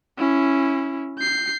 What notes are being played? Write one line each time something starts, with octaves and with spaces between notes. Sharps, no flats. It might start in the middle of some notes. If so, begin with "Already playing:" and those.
C#4 E4
G6 C7